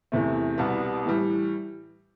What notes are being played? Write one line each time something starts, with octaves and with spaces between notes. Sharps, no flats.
E2 C3 E3 A3
C2 B2 G3 B3
A2 E3 G3